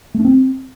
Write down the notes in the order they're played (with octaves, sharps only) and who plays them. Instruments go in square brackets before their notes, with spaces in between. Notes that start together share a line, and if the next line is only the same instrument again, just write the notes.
[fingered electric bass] A3
D4
C4